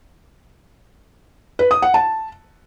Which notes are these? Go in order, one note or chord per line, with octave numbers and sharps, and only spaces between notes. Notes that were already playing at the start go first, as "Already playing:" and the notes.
B4
D#6
F#5
A5